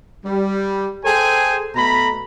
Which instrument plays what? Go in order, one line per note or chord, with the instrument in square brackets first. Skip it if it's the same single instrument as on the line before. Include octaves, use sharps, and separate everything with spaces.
[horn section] G3
G#4 A4 C5 G5 G#5
B2 A3 A#5 B5